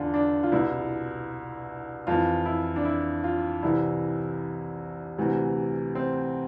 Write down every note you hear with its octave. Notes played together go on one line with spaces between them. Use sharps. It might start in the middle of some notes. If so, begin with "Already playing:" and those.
Already playing: E2 D3 D4 F4
D4
F4
C2 B2 E4
F2 E3 F4
E4
D4
E4
F4
C2 C3 E3 E4
D2 C3 E3
C4